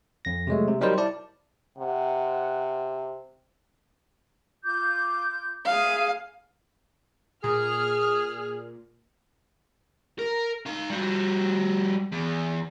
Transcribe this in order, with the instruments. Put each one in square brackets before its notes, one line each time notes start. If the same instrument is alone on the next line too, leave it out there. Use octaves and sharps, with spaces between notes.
[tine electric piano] F2 A#6
C3 F#3 G#3 A3
C3
F#3 G3 D#4 A#4 C5
E4 D5 A5
[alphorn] C3 [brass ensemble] F#5
[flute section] F4 D6 G6
[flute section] G#4 E5 G#5 [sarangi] F5
[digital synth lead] A#2 [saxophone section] G#4 [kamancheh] F6
[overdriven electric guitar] A#4
D#4 F5
G3 F#4
E2